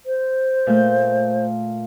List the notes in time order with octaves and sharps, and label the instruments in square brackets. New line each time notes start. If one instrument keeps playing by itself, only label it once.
[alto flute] C5
[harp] A#2 A3 G6